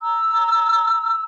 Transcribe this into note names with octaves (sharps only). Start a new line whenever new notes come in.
A#5 E6